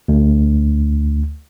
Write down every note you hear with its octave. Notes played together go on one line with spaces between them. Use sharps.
D2